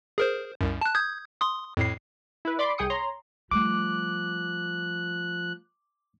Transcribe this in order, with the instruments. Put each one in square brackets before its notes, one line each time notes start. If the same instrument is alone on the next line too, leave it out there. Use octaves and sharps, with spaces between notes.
[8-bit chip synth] G#4 A#4 C5
C2 F#2
A5 F#6
D#6 G6 G#6
C6 D#6
F2 A2 C7
[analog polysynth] E4 B4
D5 B5 C6 D6
C2 G#4 G5 D#6 C#7
C#5 A#5 C6
[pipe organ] F3 F#6 [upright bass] G3 A3 [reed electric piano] D6